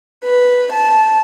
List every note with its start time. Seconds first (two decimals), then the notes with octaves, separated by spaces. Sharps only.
0.24 B4
0.72 A5